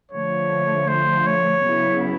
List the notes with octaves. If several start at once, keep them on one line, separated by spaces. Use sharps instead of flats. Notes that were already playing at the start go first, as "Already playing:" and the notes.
D3 F3 A3 C#5
C5
C#5
C#3 F#3 B3 E4